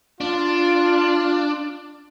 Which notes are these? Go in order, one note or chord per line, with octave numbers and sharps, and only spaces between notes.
D4 F4